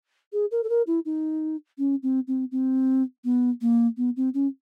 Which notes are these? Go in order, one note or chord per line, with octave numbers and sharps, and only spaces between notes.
G#4
A#4
A4
A#4
E4
D#4
C#4
C4
C4
C4
B3
A#3
B3
C4
C#4